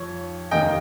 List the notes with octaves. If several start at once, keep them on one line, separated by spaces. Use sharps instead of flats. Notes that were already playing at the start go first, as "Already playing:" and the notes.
Already playing: F2 F3 C#5
F1 D#2 D#3 A#3 D#5 G5